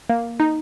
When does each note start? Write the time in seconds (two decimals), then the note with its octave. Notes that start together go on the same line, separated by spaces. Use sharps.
0.09 A#3
0.40 D#4